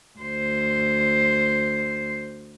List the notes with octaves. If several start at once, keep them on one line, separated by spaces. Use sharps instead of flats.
D2 C5